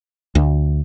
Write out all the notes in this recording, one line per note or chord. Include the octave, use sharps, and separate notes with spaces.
D2